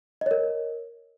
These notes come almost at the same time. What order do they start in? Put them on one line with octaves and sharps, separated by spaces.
D#5 C#5 A#4